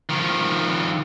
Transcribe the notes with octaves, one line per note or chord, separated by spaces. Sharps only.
D#3 F3